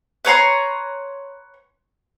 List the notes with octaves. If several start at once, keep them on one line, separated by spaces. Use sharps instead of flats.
B4 C#5 A#5 C6